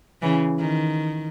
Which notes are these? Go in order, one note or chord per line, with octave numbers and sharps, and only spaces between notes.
C#3 E3
D#3